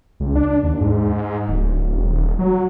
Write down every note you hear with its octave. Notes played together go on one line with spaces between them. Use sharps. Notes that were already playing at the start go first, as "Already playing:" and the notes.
C#2
D4
D#2
G#2
D1
E1
D#1
F#3